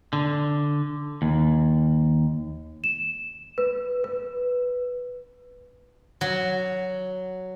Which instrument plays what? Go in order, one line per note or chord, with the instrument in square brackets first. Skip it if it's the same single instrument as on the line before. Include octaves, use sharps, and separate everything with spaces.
[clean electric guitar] D3
D#2
[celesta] E7
B4
B4
[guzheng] F#3